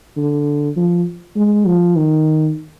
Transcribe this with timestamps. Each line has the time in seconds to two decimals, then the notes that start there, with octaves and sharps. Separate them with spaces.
0.17 D3
0.76 F3
1.36 G#3
1.66 F3
1.96 D#3